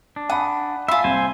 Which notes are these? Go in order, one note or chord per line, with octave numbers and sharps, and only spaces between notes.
D4
F#5 G#5 B5 D#6
F4 E5 G#5 B5 C6
C2 C5 G#5